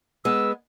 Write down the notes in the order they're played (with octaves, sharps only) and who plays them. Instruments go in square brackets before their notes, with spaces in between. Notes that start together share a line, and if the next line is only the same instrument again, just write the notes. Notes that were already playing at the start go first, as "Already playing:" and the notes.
[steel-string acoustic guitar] G#3 B3 [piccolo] E6